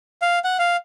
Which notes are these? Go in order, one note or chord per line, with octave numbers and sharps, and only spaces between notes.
F5
F#5
F5